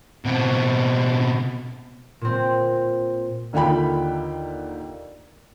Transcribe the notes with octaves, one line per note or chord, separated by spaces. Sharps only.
B2 C4
A#2 C4
D#2 D3 A#3 F4 G5 B5